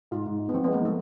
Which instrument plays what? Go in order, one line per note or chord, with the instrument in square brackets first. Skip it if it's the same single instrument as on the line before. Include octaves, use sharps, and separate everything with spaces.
[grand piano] G#2 [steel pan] F4
[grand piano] G#2
G#3
[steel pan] B3
[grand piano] F3 [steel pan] C4
[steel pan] B3
[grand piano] G#3
[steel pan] A#3
[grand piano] F3 [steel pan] A3